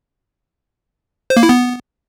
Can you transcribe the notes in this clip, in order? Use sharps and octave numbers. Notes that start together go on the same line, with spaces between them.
C5
A#3
E4
B3